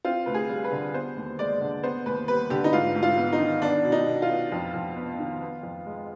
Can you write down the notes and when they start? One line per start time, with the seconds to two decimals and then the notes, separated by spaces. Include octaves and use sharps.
0.05 C4 F4
0.26 D2 B4
0.34 G#4
0.50 G3
0.64 B4
0.72 D3
0.94 B3 C5
1.16 D#2
1.39 G#3 D5
1.61 D3
1.83 B3 C5
2.06 D#2 B4
2.28 G3 B4
2.50 D3 G4
2.64 D#4
2.72 G#2 F4
2.95 G#2
3.03 F4
3.17 B3
3.33 D#4
3.40 D#3
3.62 B3 D4
3.84 B2
3.92 D#4
4.07 B2
4.22 F4
4.29 B3
4.52 F2
4.74 F2
4.96 B3
5.19 D#3
5.42 B3
5.63 F2
5.86 G#3